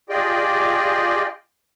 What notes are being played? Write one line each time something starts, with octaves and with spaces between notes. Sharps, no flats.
F4 G4 G#4 D5 D#5 G5